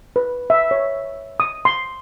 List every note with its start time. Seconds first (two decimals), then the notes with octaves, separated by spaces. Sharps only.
0.16 B4
0.50 E5
0.71 C#5
1.40 D#6
1.65 C6